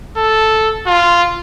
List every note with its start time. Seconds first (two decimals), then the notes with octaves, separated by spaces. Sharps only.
0.17 A4
0.87 F4